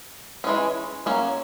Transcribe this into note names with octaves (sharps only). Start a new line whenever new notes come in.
E3 G#3 C#4
F#3 A#3 C#4